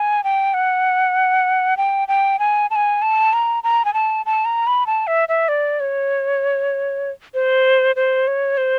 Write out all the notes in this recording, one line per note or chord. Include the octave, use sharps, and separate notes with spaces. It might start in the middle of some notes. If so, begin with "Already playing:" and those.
Already playing: G#5
G5
F#5
G5
G5
G#5
A5
G#5
A5
A#5
A#5
G#5
A5
A5
A#5
B5
A5
E5
E5
D5
C#5
C5
C5
C#5
C5